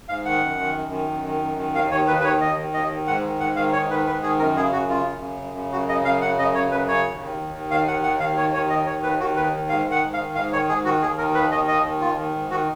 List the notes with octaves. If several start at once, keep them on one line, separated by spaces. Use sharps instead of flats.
G#2 F5
D#3 F#5
F#2
D#3
F#2
D#3
F#2
D#3
F#2
D#3
D#2 F5
D#3 C#5
D#2 B4
B4
D#3 C#5
D#2 D#5
D#3
D#2 D#5
D#3
G#2 F#5
D#3
G#2 F#5
D#3 F5
G#2 C#5
D#3 B4
G#2 B4
D#3 G#4
F#2 A#4
C#3 G#4
F#2 F#4
C#3 F4
F#2
C#3
F#2
C#3
F#2 F#4
C#3 D#5
F#2 F5
C#3 F#5
F#2 D#5
C#3 C#5
F#2 B4
C#3 C#5
D#2
D#3
D#2
D#3
D#2 F5
D#3 F#5
D#2 F#5
D#3 F5
D#2 C#5
D#3 C#5
D#2 D#5
D#3 C#5
D#2 B4
D#3 F#4
D#2 B4
D#3
G#2 F5
D#3
F#5
G#2
F5
D#3
G#2 F5
D#3 C#5
G#2 G#4
D#3 F#4
D#2 G#4
D#3 A#4
D#2 B4
D#3 D#5
D#2 D#5
D#3
D#2 F4
D#3
G#2
D#3 F#4